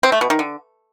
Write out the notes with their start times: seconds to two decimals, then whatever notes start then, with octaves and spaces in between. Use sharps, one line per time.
0.03 C4
0.12 A3
0.21 B2
0.30 D#3
0.39 D3